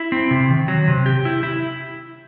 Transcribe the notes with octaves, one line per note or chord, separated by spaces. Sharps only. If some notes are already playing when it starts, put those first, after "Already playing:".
Already playing: E4
C4
C3
D#3
F#3
C3
G4
E4
E4